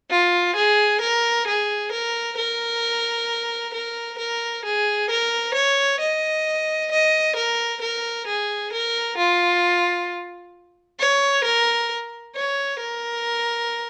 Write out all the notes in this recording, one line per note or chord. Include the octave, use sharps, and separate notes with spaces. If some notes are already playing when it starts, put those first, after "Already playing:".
F4
G#4
A#4
G#4
A#4
A#4
A#4
A#4
G#4
A#4
C#5
D#5
D#5
A#4
A#4
G#4
A#4
F4
C#5
A#4
C#5
A#4